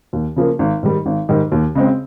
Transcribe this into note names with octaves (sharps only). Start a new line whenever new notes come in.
D#2
C#3 F3 A#3
G#1
G#2 D#3 G3
G#1
G#2 D#3 G3
D#2
C#3 G#3 C4